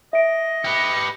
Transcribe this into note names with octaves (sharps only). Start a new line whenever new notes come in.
D#5 E5 D7
G4 B4 C#7